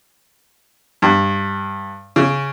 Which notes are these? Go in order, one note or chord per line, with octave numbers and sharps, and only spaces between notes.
G2
C#3